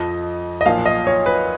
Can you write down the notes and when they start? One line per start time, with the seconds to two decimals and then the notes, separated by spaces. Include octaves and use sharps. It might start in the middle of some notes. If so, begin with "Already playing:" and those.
Already playing: F2 F3 D#5
0.61 D#5
0.66 B1 A#2 F3 F5
0.86 D#5
1.07 C#5
1.26 B4